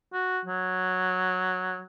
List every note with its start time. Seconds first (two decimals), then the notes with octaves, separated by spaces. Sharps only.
0.13 F#4
0.45 F#3